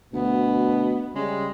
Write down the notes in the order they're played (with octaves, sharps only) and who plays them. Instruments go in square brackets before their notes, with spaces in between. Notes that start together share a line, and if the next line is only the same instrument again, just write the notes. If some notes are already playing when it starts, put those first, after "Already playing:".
[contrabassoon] D2 [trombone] B2 [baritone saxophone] B3
[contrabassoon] C#3 [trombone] G3 [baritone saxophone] G#3